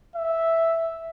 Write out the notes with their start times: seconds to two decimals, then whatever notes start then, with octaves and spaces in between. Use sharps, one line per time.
0.15 E5